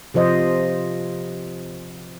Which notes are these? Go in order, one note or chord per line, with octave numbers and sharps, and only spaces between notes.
C3 F3 C5 D#5